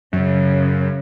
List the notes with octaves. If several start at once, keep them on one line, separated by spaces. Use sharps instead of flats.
F#2 C#3